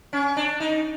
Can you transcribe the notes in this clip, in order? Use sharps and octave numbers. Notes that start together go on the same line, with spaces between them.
C#4
D4
D#4